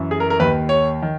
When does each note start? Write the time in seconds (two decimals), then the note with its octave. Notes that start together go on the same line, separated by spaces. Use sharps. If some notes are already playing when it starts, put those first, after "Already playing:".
Already playing: F#2 E3
0.11 G#4
0.20 A#4
0.30 A#4
0.40 D#2 D#3 B4
0.69 C#5
1.02 D#3